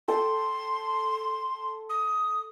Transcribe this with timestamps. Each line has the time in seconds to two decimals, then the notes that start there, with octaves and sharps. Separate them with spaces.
0.08 A4 G5 C6
1.90 D#6